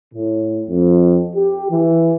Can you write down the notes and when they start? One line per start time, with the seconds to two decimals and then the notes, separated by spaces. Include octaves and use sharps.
0.14 A2
0.68 F2
1.36 G4
1.71 E3